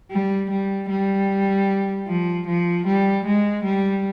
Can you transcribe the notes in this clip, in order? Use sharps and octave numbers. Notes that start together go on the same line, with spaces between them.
G3
G3
G3
F3
F3
G3
G#3
G3